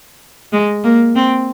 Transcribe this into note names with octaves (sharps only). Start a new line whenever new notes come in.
G#3
A#3
C4